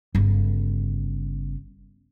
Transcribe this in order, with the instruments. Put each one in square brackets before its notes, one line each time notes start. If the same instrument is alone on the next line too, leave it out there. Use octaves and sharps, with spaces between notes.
[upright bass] G1 C#3